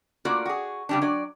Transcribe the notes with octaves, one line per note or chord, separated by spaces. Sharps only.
A3 A#3 F4 F#4 D5
F#4 G#4
C#3 G3 D4
F#3 D5